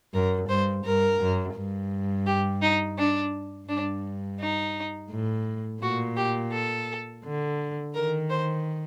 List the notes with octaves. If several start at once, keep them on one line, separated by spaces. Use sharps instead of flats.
F#2 A#4
G2 C5
G2 A#4
F#2
G2
G4
D#4
D4
G2 D4
D#4
A2
A#2 F#4
G4
A4
D3
D#3 A#4
C5